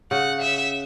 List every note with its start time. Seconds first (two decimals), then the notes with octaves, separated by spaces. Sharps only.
0.11 C#3 F#5
0.41 E5